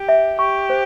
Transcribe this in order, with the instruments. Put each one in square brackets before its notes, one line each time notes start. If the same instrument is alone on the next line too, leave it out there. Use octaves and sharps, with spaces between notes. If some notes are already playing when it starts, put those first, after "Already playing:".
Already playing: [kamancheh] G4
[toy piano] E5
[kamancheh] G4 [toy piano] C#6
[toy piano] C5